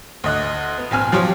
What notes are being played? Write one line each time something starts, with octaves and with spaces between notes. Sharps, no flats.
D2 D#5 F#6
B3
A#1 C4 G#5 F6
F3 F#3 G4 C5 C#5